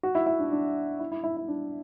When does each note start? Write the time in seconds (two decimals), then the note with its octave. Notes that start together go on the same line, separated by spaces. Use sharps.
0.03 F#4
0.15 E4
0.26 E4
0.39 D4
0.52 D4
0.99 E4
1.11 E4
1.24 E4
1.37 E4
1.48 D4